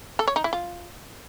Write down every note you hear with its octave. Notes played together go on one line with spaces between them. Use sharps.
A4
C#5
D#4
E4
F4